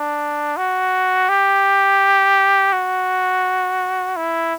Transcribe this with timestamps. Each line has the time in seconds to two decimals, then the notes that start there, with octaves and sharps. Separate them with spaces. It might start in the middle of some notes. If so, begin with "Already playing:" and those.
Already playing: D4
0.57 F#4
1.29 G4
2.73 F#4
4.16 E4